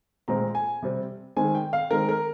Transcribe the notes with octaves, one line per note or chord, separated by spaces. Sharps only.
A#2 G#3 C4 A#5
G#5
C3 G3 C4
D#3 G#3 C4 G#5
G5
F5
D#3 G#3 C4 A#4
A#4